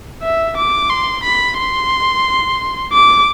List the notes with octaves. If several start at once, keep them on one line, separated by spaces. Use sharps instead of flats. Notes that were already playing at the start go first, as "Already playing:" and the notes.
E5
D6
C6
B5
C6
D6